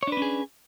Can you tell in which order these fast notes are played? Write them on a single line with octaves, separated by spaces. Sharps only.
C#5 D4 B4 C#4 G#4